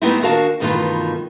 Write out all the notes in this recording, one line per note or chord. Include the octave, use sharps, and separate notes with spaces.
G3 A3 B3 C4 D#4 E4
D#2 D4 F#4 A#4 F5 A5
G2 B2 D#3 E3 A3 F4